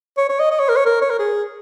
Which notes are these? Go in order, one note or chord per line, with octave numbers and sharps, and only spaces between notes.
C#5
C#5
D#5
D#5
C#5
A#4
C#5
A#4
C#5
A#4
G#4